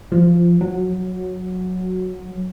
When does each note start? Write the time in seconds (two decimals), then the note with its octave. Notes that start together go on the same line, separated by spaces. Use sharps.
0.12 F3
0.61 F#3